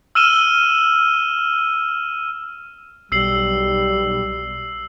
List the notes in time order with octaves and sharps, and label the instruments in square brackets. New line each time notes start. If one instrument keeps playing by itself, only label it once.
[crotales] E6 F6 D#7 E7 G7
[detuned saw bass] B1 [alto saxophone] G3 [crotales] E6 C7 F#7